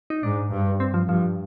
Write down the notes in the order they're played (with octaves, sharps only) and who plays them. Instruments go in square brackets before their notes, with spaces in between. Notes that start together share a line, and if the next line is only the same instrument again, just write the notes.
[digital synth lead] D#4
[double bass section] G#2 [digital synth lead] D4
[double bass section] G2
[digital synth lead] C4
F3
[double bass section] G2 [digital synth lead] F3